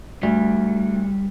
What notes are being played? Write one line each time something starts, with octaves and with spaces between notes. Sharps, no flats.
D2 G3